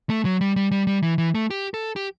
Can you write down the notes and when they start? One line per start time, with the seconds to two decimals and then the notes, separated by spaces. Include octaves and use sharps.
0.10 A3
0.25 F#3
0.41 G3
0.56 G3
0.71 G3
0.87 G3
1.03 E3
1.18 E3
1.35 A3
1.50 G4
1.74 A4
1.96 G4